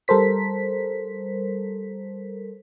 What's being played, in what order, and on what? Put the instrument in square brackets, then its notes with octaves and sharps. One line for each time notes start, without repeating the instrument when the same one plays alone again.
[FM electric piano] G3 A4 A#4 C5 B6